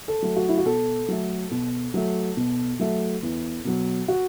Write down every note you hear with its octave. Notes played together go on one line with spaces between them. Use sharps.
A4
F#3 A3
F#4
E4
F#4
B2 A4
F#3 A3
B2
F#3 A3
B2
F#3 A3
E2
B2 F#3
F#4